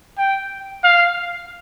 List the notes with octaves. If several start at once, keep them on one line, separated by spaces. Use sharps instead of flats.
G5
F5